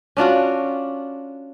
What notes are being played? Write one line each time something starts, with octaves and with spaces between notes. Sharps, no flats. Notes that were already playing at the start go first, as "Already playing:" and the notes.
C#4 D4 F4 F#4